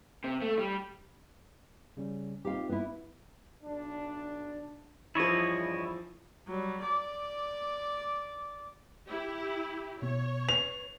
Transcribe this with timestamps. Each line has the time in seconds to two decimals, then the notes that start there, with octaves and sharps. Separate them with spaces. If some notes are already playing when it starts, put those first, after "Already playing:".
0.24 C3
0.42 A3
0.59 G3
1.97 C#3 G3 C#4
2.45 C4 D#4 F4 G4 F5
2.69 B3 E4
3.64 B1 D4
5.15 E2 G2 E3 F3 E4 C#5 D#5
6.47 F#3 G3
6.82 D5 D6
9.08 E4 G4
10.02 B2 B3 C#5
10.49 B4 F7